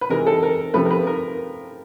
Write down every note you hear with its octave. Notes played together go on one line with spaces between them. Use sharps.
B4
C3 E3 G#3 A#4
A4
A#4
C3 F3 A3 B4
A#4
B4
A#4